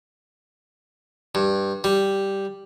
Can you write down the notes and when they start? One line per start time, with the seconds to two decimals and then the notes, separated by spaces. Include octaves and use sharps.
1.35 G2
1.84 G3